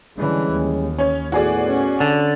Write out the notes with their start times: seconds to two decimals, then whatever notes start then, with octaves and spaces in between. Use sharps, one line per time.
0.17 D3 E3 G3 G#3 C#4
0.52 D#2
0.98 C#4 C#5
1.32 A2 D#3 B3 F#4 G#4 D5
1.64 C#4
2.00 D3